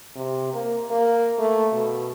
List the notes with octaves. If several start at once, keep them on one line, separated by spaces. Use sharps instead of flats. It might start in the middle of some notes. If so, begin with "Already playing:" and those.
C3
A#3
A#3
A3
B2